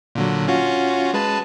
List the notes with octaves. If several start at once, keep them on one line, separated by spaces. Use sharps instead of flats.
A#2 D3 F#3
C#4 F4 F#4
G#3 B4 A5